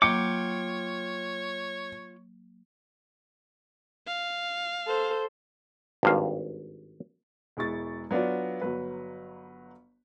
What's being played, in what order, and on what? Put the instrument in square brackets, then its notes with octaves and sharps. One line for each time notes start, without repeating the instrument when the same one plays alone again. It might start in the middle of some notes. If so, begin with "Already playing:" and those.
[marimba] F#3 A#3 [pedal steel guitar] F4 G5 D6 [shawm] C#5 [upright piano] C#7
[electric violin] F5
[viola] A4 C5
[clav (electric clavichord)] G#1 G2 F5
[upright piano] E1 G#3 E4 C#6 A6
F#3 B3 D4 F4 D5
G1 F#3 B4